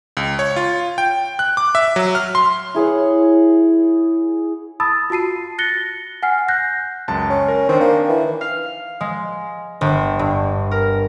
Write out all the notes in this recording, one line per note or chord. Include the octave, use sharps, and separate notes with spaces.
C#2
C#5
F4
G5
F#6
D6
E5
F#3
F6
C6
E4 G#4 C#5 F#5
A5 B5 D#6 E6 A6
F4 F#4 A5 C7 D#7
F#6 A6 A#6 C#7 G7
F#5 G#5 F6 C7
F#6 G6 A#6 C7
C#2 F#2 A5
C#4
A#4
D#3 C4 D4
A#3
E3
F5
G#3
G1
G2
A#4